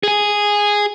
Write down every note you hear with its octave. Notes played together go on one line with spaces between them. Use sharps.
G#4 G#5